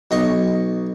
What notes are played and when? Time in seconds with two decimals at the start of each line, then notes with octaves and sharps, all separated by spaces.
0.11 B1 D#5 C#6